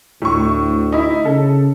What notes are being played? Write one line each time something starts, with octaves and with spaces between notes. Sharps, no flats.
D2 A2 C#6
D#4 E4
C#3 A4